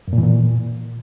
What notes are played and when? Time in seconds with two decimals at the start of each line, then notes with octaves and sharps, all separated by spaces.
0.08 F#2
0.13 A#2
0.18 E3
0.23 A#2